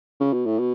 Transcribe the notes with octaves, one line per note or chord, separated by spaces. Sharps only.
C#3
B2
A2
B2